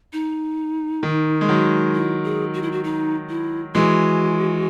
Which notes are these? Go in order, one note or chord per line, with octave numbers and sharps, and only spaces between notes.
D#4
D#3
G#3
D#3 F#3
E4
G#4
F#4
E4
F#4
D#4
E4
E3 G#3 F#4